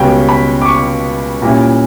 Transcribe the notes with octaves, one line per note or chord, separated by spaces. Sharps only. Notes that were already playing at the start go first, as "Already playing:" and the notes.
Already playing: C#2 B2 G3 C#4 G5
B5
D6
C#6
A#2 G3 C#4 E4